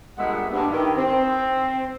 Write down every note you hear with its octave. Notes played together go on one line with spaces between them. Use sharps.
G2 A#2 G#3 B3 E5 F#5
G2
D#3 E4 G4
C4